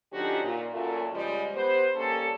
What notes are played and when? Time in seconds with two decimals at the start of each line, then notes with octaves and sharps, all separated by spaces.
0.13 D3 F3 C#4 D#4 F#4 G4
0.43 A#2
0.72 F#2 A#2 A3
1.12 C#3 F3 G3 G#3
1.54 B3 G4 B4 C5
1.96 G3 A#3 C#4 A4